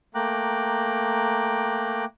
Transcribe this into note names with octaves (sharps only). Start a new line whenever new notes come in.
A3 A#3 G5 A#5 D6 F#6